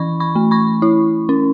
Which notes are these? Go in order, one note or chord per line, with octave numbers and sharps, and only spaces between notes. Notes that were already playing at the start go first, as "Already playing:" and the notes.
Already playing: E3 C#4 E4 B5 C#6
B5 C#6
A3
B5 C#6
E4
C#4